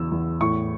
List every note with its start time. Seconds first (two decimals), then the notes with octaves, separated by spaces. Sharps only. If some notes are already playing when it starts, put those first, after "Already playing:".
Already playing: E2 C#3 E6
0.11 E2
0.41 A2 C#6